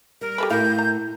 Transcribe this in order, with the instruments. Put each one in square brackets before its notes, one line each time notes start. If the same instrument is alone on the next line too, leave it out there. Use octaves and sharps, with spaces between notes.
[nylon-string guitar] G3 [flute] A#4
[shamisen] G4 A4 B4
[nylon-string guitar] A2 A#4 [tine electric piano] E4 [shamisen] F5 [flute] G6
[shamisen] A#5